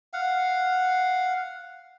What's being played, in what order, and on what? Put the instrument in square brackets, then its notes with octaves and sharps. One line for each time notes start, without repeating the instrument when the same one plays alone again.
[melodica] F5 F#5